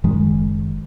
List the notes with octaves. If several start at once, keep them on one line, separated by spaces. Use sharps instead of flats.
F#1 D#3 G#3